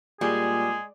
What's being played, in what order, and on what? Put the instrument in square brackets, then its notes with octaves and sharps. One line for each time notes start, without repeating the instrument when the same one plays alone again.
[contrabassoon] A#2 [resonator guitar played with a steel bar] G3 [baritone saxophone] G#3 [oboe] G#4